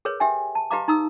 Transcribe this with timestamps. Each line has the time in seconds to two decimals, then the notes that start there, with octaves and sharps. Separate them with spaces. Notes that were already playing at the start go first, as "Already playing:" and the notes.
0.05 G#4 A#4 B4 C#5
0.20 G4 E5 G5 G#5
0.55 A5
0.71 G4 B4 D#5 F5 A#5 D6
0.88 D#4 A#5 D#6 E6